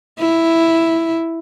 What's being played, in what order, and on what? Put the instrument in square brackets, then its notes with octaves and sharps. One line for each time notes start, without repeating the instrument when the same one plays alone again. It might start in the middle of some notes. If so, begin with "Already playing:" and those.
[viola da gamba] E4